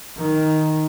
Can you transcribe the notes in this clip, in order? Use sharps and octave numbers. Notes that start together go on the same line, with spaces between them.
D#3